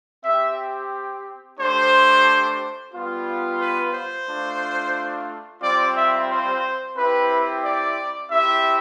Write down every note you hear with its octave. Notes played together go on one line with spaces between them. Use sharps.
C4 G4 E5
A3 D4 G4 C5
G3 B3 F4
B4
C5
A3 D4 F4
G3 C4 F4 D5
E5
C5
C4 E4 G4 B4
D5
C4 E4 G4 E5